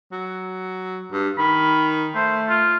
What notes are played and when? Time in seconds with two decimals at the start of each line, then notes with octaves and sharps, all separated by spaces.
0.12 F#3
1.12 G2
1.38 D#3 B5
2.15 A3 C5
2.49 F4